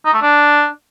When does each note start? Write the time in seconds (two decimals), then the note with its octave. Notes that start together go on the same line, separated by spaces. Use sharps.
0.05 D#4
0.14 A3
0.22 D4